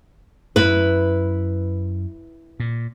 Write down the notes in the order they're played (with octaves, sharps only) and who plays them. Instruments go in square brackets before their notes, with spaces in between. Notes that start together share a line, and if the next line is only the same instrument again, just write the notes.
[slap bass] F#2 [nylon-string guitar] E4 B4
[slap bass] A#2